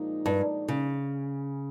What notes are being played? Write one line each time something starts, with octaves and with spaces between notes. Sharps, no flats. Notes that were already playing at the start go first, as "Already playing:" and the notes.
Already playing: A#2 F3 G#3 D#4
G2
C#3